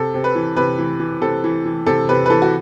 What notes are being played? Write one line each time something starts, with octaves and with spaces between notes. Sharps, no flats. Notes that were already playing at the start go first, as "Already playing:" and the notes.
Already playing: C3 A4
C3
B4
E3
C3 B4
E3
E3
C3 A4
E3
E3
C3 A4
C3 B4
B4
E3 A4
F#4